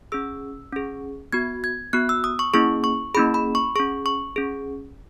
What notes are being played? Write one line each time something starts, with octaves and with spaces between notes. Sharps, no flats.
C#4 G#4 E6
C#4 G#4
B3 F#4 G#6
G#6
B3 F#4 F#6
E6
D#6
C#6
A#3 C#4 E4 G#4 C#6
C#6
A#3 C#4 E4 G#4 B5
B5
C#6
C#4 G#4 C#6
C#6
C#4 G#4